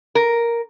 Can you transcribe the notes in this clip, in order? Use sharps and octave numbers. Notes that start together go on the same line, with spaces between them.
A#4